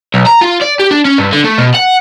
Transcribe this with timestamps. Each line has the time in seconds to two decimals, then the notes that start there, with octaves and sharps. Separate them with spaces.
0.14 B1
0.27 A#5
0.42 F4
0.62 D5
0.80 G4
0.91 D4
1.05 C#4
1.18 G2
1.33 D3
1.45 A3
1.58 B2
1.75 F#5